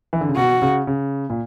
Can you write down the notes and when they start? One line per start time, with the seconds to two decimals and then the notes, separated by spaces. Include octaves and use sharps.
0.13 E3
0.21 D3
0.29 C#3
0.36 B2 F#4
0.62 C#3
0.87 C#3
1.30 A#2